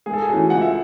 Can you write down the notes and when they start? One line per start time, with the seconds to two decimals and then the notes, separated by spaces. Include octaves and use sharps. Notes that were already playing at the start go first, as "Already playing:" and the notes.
0.06 G#2 G#4
0.13 A4
0.22 G#4
0.28 E3 A3 C#4 F#4
0.50 C#2 F#5
0.61 E5